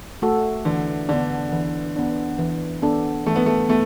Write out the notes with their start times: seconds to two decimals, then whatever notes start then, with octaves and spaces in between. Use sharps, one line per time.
0.22 A3 F#4 A4
0.65 D3 E3
1.09 D3 B3 D4
1.52 E3
1.96 B3 D4
2.39 E3
2.82 B3 D4 A4
3.26 E3 A3
3.36 B3
3.46 A3
3.69 A3 B3